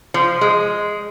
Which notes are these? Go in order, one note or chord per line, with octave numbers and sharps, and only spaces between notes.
F3
G#3